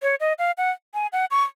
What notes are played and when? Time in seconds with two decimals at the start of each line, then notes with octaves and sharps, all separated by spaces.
0.02 C#5
0.20 D#5
0.39 F5
0.58 F#5
0.94 G#5
1.13 F#5
1.31 C#6